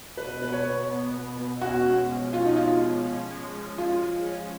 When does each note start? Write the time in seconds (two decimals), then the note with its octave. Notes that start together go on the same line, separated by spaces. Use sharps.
0.17 B2 B4
0.42 B2 B4
0.53 C#5
0.66 B2
0.90 B3
1.14 B2
1.37 B2
1.61 C#4 F#4
1.86 G#3
2.10 F3
2.33 C#4 F4
2.46 D#4
2.56 G#3 F4
2.81 F3
3.06 C#4
3.31 G#3
3.54 F3
3.78 G#3 F4
4.03 G#3
4.26 C#4